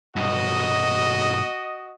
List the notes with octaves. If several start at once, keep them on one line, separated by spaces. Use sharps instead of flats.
B1 G2 F#4 D#5